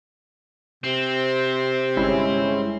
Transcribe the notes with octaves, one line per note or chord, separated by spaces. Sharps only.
C3 C4
G1 G#3 C#4 E4